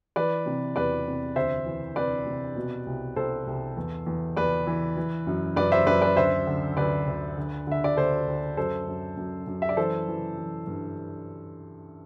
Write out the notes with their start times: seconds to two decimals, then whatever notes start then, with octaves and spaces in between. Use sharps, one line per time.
0.16 E3 B4 D5
0.46 C3
0.76 E2 B4 D5
1.06 C3
1.36 D2 C5 E5
1.66 E3
1.96 C3 B4 D5
2.26 C3
2.56 B2
2.86 C2
3.16 C2 A4 C5
3.47 C2
3.77 E2
4.06 E2
4.36 E2 B4 D5
4.67 E3
4.97 E3
5.27 F#2
5.56 F#2 B4 D5
5.72 C5 E5
5.86 F#2 B4 D5
6.02 B4 D5
6.17 D2 C5 E5
6.47 D3
6.77 D2 B4 D5
7.07 D2
7.37 D3
7.67 D3 E5
7.84 D5
7.97 D2 A4 C5
8.27 D2
8.57 F#2 A4 C5
8.87 F#2
9.17 F#2
9.47 F#2
9.62 E5
9.69 D5
9.77 E3 A4 C5
10.08 E3
10.37 E3
10.67 G2